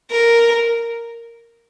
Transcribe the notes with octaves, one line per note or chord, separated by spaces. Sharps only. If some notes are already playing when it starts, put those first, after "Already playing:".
A#4